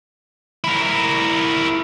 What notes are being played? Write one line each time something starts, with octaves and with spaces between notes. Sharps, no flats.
E4 A#4